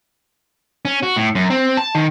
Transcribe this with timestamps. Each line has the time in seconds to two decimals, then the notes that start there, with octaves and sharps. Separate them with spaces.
0.85 C#4
1.03 F#4
1.16 A2
1.35 F#2
1.50 C4
1.77 A5
1.95 D#3